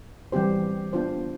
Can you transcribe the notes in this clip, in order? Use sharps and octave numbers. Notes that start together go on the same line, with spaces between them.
E3 G3 C4 G4 C5
B3 D4 F4 C5